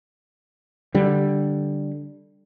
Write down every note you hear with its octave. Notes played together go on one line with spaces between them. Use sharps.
D3 G3